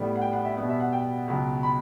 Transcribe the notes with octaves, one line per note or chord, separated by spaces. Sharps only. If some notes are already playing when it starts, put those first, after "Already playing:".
Already playing: A2 G3 B3
F#5
G5
F#5
E5
B2 G3 B3 E5
E5
F#5
G5
C#2 B2 F#3
B5